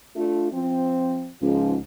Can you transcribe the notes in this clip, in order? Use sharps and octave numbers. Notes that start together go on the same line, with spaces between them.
A3 D4 F4
F3 C4
C#2 G#2 F3